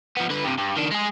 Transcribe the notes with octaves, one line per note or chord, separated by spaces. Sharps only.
F3 B3
D3 B4
G2 C3
G2
D#3 D4
G#3 G#4